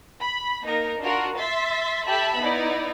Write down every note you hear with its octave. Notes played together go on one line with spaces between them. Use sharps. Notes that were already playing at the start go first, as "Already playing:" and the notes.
B5
A#3 D#4 A#4
D4 F4 F#4 A#4
E5 C6 A6 B6
G4 A4 E5 A5 B5
B3 D#4 E4 D5